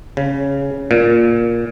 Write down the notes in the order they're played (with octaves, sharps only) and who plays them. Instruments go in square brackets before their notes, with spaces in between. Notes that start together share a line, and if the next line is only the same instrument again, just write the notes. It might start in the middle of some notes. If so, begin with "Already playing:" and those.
[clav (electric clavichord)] C#3
A#2